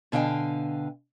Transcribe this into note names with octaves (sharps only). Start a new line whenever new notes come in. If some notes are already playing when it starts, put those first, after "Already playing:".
B2 D3 F5 G5 G#5